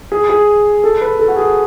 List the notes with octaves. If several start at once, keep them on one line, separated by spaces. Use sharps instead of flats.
G#4
G#4
A4
B4
A4
F#4
G#4